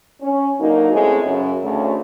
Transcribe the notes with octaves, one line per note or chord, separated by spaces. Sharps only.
C#4
D3 F#3 A#3 D#4
C#3 G#3 A3 C4 E4 C#5
F#2 C#3
D2 C#3 A3